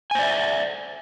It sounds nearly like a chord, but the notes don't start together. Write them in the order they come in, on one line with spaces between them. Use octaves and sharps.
G#5 C5 D5 E5